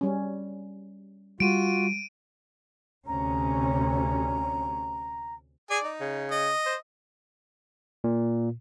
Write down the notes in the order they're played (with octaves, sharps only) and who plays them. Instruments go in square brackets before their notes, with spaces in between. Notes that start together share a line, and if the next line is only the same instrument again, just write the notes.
[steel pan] G3 C#4
[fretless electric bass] G3 [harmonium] F4 F#4 [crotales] D7 D#7
[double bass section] D2 C3 C#4 [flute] A#5
[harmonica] G#4 G#5 [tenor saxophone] D5
[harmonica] D#4
[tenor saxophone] C#3
[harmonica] D#5
[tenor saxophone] C5
[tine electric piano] A#2